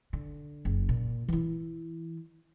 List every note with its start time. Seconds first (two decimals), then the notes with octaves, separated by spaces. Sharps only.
0.13 D3
0.65 F#1
0.89 A#2
1.28 E3 E4